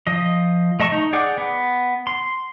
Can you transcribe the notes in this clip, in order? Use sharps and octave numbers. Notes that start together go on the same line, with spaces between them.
F3 D#5
A3 D#5 A5 C#6
D#4
G#4 D5 F#5 G5 D6
B3
C6